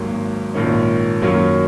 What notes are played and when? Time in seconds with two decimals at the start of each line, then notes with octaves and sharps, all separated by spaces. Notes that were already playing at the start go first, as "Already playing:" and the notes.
Already playing: G#1 G#2 F#3 A#3
0.54 A#1 G#2 D#3 A#3 C#4
1.22 F#2 D#3 F#3 A#3 C#4